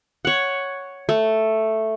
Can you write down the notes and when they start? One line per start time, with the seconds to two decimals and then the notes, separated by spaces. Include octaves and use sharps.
0.25 C#5 F#5
1.09 A3